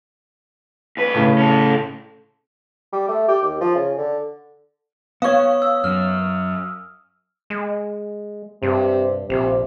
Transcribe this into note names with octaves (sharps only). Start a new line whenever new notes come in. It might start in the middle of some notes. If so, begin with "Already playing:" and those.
D2 B4
A2 C#3
C#4 A4
G3
A3
G4
D#2
F3
C#3
D3
B3 C#5 F5 C#6 D#6
E6
F#2 F6
G#3
G2 C3
A#1 C3